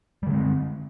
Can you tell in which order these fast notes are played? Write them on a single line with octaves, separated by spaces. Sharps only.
G3 D3 G#3 C4